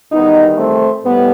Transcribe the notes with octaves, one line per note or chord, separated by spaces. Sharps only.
E2 D#3 G3 B3 D#4
A3 C4
A2 G3 B3